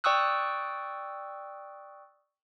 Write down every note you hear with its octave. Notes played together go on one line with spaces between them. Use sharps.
D5 G5 C#6 D#6 E6 F#6